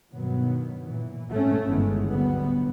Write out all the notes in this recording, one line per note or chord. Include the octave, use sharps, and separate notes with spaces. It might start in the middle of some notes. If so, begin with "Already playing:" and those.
G2 B2 D#3 F#3 B3
A#2 E3
G#2 A3 C#4
G1 G#2 D#3 E3 G#3 B3
D2 A2 D3 F#3 G3 B3